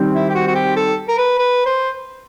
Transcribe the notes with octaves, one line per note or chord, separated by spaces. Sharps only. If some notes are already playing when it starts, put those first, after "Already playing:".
Already playing: D#3 G3 C4
E4
G4
F#4
F#4
G4
A4
A#4
B4
B4
C5